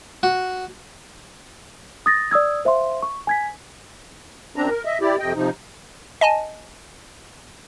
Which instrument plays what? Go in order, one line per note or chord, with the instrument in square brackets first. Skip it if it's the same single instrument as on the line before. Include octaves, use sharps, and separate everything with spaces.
[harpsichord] F#4
[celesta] D#6 A6 A#6
D5 D#6 E6 G#6
C5 E5 F5 C6
C#6
G#5 G#6 B6
[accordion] F#2 C4 D4 A#5
A#4
D#5 E5
E4 G4 D5
F2 C3 D#5 G5
C3 F3 D#4
[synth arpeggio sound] D#5 G#5 A5